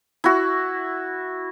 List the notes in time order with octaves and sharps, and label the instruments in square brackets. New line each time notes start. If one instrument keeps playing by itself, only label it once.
[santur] E4 F#4